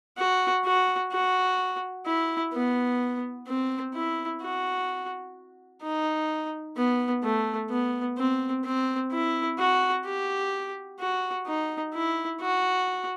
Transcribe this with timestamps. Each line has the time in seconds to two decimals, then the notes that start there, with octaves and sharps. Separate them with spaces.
0.18 F#4
0.65 F#4
1.12 F#4
2.06 E4
2.53 B3
3.47 C4
3.94 E4
4.42 F#4
5.82 D#4
6.77 B3
7.23 A3
7.70 B3
8.18 C4
8.64 C4
9.12 E4
9.59 F#4
10.05 G4
11.00 F#4
11.46 D#4
11.94 E4
12.41 F#4